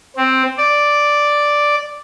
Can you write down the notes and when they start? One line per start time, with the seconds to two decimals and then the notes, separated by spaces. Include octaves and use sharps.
0.16 C4
0.57 D5